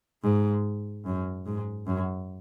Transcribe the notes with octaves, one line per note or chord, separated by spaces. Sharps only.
G#2
F#2
G#2
F#2